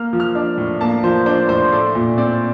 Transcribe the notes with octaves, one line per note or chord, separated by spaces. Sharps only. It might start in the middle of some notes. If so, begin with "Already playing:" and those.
Already playing: A#3 F6
F3
F6
D4
A2
A#3 A5
F3 C5
D4 C5
A2 C5
A3 D5
A#2
C4 D5